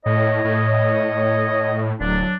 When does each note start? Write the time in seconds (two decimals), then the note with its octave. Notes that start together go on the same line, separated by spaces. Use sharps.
0.06 A2 C#5 D#5
0.44 A2
2.00 D1 F#3 D4